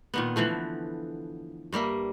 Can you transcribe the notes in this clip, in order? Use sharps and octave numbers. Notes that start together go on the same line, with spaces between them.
A#2 D#3 B3
D3 E3 F3 A3
G2 G3 A#3 E5